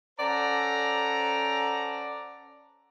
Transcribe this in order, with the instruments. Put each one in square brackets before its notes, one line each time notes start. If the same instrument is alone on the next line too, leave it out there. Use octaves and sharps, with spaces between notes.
[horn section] C#4 A4 C5 D5 F#5 A#5